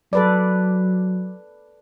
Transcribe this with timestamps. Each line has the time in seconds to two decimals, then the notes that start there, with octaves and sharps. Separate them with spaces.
0.13 F#3 A4 B4 D5